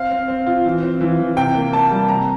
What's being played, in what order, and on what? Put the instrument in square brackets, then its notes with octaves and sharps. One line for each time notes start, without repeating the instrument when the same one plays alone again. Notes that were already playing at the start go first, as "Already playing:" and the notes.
Already playing: [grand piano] C4 F5
C4
C4
F4
E3
C4
E3
E3
C3 G5
A#3
A#3 A5
G3
C3 A#5